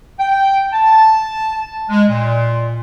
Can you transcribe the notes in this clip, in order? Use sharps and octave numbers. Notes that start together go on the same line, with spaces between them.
G5
A5
G#3
A#2